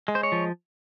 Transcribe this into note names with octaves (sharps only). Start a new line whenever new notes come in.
G#3
C5
C#5
F3